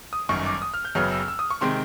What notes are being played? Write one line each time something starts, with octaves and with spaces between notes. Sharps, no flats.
D#6
G1 F#2 D#3 C#6
D6
D#6
F6
G6
F#1 F#2 C#3 F#3 B3 F6
E6
E6
D#6
C#6
C3 D#3 G#3 C4 C6